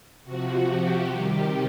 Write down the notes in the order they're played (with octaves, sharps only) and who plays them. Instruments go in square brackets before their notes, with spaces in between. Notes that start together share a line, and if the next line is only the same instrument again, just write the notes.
[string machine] C3 F3 F#4
G4
C3 D#3 G3